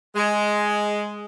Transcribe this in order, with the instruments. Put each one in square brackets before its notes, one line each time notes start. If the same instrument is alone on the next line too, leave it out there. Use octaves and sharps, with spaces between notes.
[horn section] G#3